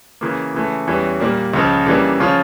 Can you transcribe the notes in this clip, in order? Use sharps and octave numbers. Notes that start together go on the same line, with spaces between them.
C#3 E3 A#3
C#3 E3 A3
E2 E3 G3 C#4
A#2 G3 A#3
C#2 C#3 F3
C#3 E3 G3 A#3 D4
C#3 F3 C#4 F4